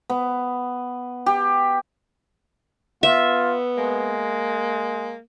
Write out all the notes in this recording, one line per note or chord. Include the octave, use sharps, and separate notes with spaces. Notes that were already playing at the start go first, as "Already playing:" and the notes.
B3
G4
B3 F4 E5
G#3 A#3